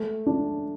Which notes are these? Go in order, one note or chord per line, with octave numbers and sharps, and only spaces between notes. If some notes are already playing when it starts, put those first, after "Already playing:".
Already playing: A3
D4